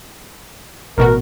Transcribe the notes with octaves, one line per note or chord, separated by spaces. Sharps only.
A1 B2 F#4 A#4